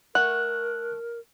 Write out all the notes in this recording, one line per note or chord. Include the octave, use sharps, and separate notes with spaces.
A3 A#4 F#5 F#6